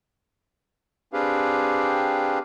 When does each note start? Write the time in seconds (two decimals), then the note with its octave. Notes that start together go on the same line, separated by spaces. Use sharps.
1.13 C4 D4 G4 G#4 B4 F5